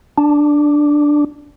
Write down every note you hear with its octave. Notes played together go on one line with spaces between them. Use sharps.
D4